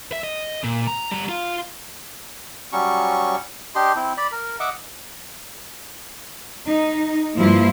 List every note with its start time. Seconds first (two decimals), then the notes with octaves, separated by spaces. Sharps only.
0.12 E5
0.24 D#5
0.64 A#2
0.87 A#5
1.12 G3 A#5
1.29 F4 F5
2.72 F#3 G3 C#4 C#6
3.75 D4 G4 D#5 C6
3.96 C4 E4
4.17 D5 B5
4.32 A#4
4.60 D#5 E5 F#5 D6
6.68 D#4
7.38 G2 F3 A#3 E4 F4